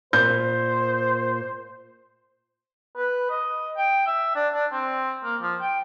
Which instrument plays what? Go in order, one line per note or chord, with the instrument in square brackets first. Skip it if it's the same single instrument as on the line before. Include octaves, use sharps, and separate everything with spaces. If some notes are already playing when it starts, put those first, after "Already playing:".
[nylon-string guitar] A#2 [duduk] C5 [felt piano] G6
[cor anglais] B4
D#5
G5
E5
D4
D4
C4
A#3
F3
G5